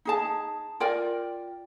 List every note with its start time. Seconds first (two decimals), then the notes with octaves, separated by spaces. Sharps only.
0.05 D#4 G#4 A5
0.80 F4 A#4 D5 G5